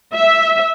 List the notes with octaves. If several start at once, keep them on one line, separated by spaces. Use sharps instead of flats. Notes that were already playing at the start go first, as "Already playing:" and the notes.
E5